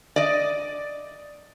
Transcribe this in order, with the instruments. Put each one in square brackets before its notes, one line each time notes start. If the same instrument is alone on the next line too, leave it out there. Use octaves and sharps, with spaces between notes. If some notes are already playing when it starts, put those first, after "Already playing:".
[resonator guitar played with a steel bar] D5 D#5